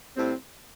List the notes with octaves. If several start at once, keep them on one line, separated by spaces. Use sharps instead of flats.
A2 G3 C4